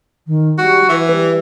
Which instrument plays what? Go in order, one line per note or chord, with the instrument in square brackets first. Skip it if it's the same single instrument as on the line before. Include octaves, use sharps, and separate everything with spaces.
[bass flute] D#3
[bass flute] G3 [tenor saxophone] F#4
[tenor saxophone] E3 [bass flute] B4
[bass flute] G3